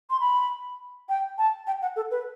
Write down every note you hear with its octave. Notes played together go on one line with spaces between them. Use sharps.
C6
B5
G5
A5
G5
F#5
A4
B4